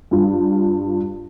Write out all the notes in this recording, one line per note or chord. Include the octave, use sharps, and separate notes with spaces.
G2 F4